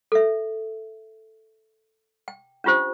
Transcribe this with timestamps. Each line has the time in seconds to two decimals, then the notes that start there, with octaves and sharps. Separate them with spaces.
0.12 A4 E5
2.28 G5
2.64 C#4 D4 F4 G4 C5